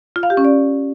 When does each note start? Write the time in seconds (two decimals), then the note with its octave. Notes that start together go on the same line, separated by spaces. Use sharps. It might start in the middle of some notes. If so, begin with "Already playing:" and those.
0.16 F4
0.23 F5
0.30 G4
0.37 C#4
0.45 D5